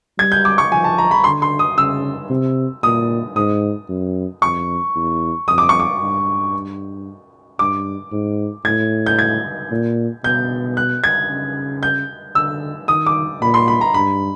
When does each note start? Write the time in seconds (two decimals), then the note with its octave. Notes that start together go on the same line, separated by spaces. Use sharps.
0.19 G3 G#6
0.32 G6
0.45 D6
0.58 C#6
0.72 F3 G#5
0.84 A5
0.98 A#5
1.11 B5
1.24 D3 C6
1.42 C6
1.59 D#6
1.77 C#3 E6
2.30 C3
2.83 A#2 D#6
3.36 G#2 D#6
3.89 F#2
4.42 F2 C#6
4.95 E2
5.48 F2 D#6
5.58 D6
5.69 C#6
5.80 D6
6.00 G2
7.59 G2 D6
8.12 G#2
8.65 A2 G#6
9.06 G6
9.19 G#6
9.71 A#2
10.24 B2 G6
10.77 F#6
11.04 G#6
11.30 C#3
11.83 G6
12.35 D3 E6
12.88 D#3 D#6
13.06 D6
13.41 A#2 B5
13.54 C6
13.68 B5
13.81 A#5
13.94 G2 B5